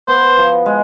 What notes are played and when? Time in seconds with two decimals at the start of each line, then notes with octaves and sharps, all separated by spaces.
0.08 B3 C5
0.37 F3
0.66 G#3